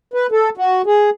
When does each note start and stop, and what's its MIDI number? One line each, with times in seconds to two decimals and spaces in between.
0.14 0.27 71
0.32 0.50 69
0.57 0.82 66
0.86 1.10 68